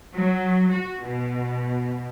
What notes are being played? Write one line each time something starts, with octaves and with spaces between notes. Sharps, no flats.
F#3
F#4
B2